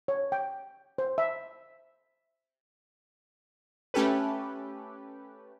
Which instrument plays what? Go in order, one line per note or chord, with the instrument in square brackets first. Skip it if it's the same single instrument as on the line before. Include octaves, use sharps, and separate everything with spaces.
[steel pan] C#5
G5
C5
E5
[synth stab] A3 C#4 G4 A4 B4